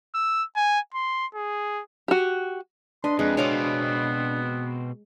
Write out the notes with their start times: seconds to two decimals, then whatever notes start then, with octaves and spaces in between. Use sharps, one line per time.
0.14 E6
0.56 G#5
0.95 C6
1.35 G#4
2.08 F#4 G4
3.04 D4 B4 D#5 C6
3.19 F2 G#3 B4
3.37 B2 B3 C4 C#5 F5 D6